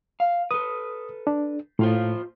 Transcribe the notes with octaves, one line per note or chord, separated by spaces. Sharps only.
F5
A4 B4 D#6
D4
A2 A#3 F4 C5